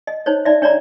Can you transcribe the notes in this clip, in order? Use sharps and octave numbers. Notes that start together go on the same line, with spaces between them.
D#5
D#4 C5 C#5
D#4 D5 E5
D4 C#5 D5 A#5 B5